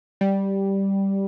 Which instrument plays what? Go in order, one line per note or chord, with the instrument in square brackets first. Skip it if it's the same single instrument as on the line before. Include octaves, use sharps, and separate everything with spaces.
[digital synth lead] G3